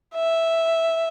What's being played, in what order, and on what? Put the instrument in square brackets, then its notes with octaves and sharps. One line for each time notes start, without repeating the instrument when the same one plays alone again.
[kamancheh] E5